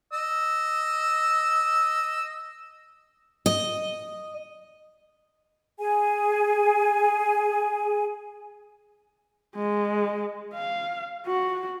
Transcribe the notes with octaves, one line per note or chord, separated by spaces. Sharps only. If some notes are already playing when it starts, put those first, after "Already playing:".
D#5 E6
D#5
G#4 G#5
G#3
F5
F#4